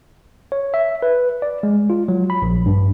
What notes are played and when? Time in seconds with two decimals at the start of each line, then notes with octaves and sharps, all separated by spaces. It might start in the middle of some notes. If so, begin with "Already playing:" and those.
0.52 C#5
0.74 E5
1.02 B4
1.42 D5
1.63 G#3
1.90 F4
2.08 F#3
2.30 B5
2.42 A#1
2.66 G2